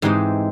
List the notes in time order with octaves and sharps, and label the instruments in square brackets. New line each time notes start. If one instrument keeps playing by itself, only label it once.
[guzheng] G#2 E3 G#3 C4 D#4 G4